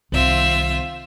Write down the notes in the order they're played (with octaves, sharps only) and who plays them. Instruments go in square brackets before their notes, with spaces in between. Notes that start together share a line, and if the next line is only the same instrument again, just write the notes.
[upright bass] C2 D#3 [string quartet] C4 F4 E5